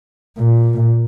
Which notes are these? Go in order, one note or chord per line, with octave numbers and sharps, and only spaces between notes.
A#2